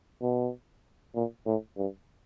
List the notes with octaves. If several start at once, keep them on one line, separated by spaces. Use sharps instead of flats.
B2
A#2
A2
G2